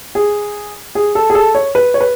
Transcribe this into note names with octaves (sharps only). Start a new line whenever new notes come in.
G#4
G#4
A4
G#4
A4
C#5
B4
C#5
B4